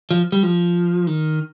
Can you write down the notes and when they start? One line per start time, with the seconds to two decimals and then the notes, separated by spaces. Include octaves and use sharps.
0.11 F3
0.32 G3
0.43 F3
1.07 D#3